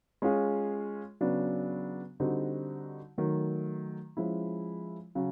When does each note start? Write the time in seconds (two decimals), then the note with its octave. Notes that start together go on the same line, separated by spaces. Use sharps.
0.22 G#3 C#4 F4 G#4
1.21 C#3 F#3 B3 D4
2.20 D3 G3 C4 D#4 F#4
3.18 D#3 F#3 A3
4.17 F3 G#3 C#4 E4
5.15 C#3 F#3